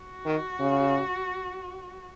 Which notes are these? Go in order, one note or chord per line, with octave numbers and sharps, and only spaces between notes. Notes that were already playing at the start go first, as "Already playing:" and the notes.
Already playing: F#4
D#3
C#3